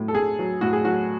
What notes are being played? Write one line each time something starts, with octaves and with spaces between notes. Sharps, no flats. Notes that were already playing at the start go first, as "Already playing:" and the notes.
Already playing: A2 F#3
A4
A2 G#4
F#3
A2 F#4
G#4
F#3 F#4